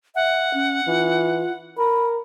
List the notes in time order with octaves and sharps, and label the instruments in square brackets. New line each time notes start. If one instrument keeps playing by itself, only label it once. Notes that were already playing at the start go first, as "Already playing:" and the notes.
[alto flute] E5 [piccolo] F#5
[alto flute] C#4
[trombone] E3 [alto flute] F4
[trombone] A#4 [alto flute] B5